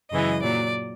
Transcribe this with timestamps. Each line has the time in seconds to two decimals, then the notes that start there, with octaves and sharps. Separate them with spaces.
0.12 F#2 C#3 E3 G#3 D#5
0.42 A#2 F#3 D5